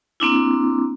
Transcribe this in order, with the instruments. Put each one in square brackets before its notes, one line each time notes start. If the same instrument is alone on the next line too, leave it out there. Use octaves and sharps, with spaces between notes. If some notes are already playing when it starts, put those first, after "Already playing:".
[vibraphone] A#3 C4 D4 E4